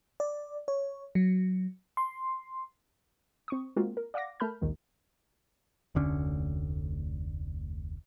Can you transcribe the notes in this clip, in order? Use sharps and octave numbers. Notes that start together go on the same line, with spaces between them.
D5
C#5
F#3
C6
C4 C#6 D#6
G#3 A#3 C4 F4 F#4
A#4
D5 F5 F#5 D6 A#6
A3 A#4 A5 B5 F6 G6
A#1 D#2 D#3 G#3
F1 D2 D3 C#4